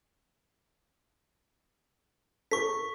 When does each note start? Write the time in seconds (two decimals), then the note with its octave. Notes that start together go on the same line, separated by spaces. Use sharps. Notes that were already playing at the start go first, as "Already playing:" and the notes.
2.51 A4 A#4 C#6 B6